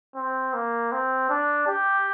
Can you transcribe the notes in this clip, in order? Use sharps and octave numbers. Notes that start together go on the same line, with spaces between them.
C4
A#3
C4
D4
G4